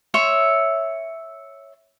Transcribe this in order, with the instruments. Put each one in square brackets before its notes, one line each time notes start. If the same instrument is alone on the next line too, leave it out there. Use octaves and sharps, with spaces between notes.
[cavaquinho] C#5 E5 C6